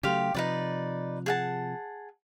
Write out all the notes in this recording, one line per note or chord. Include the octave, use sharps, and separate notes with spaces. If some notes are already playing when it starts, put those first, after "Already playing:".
C#3 F#3 A3 G4 F5 C6
C3 F3 D#4 B4 D5
G#4 F#5 A5